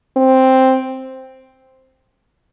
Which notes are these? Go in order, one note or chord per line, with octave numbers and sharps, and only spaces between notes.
C4